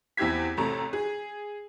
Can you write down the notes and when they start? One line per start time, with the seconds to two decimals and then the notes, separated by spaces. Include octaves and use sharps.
0.17 E2 C4 E4 G4 G#6 B6
0.57 A1 C3 A3 A#5
0.93 G#4